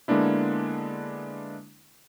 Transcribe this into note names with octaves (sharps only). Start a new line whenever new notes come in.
D3 G#3 A#3 B3 D4 E4